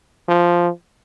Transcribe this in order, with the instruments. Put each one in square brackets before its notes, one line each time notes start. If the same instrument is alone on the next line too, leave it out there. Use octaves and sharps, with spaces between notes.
[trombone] F3